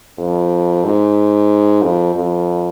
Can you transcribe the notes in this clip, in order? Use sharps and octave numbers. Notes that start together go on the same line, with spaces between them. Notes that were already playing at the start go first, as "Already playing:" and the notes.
F2
G#2
F2
F2